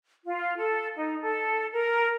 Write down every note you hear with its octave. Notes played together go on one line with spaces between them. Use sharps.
F4
A4
D#4
A4
A#4